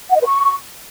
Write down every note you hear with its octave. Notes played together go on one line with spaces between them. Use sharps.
F#5
D#5
B4
C#6